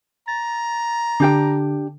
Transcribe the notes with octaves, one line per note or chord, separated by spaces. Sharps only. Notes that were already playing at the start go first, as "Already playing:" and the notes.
A#5 A6
D3 D4 G4 G5